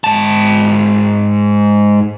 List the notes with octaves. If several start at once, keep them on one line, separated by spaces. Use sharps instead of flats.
G#2 A5